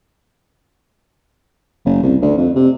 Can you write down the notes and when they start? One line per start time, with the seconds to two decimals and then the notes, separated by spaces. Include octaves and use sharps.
1.85 F#1
2.03 C2
2.21 D2
2.37 F2
2.56 C3